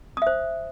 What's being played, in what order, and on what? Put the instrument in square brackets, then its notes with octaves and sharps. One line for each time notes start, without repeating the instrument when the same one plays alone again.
[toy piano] D#6
E5
C5